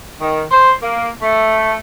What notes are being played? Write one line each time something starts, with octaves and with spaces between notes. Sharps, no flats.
D#3
C5
A#3
A3